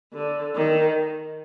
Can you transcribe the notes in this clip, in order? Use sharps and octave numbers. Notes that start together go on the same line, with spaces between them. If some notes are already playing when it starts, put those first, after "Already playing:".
D3
D#3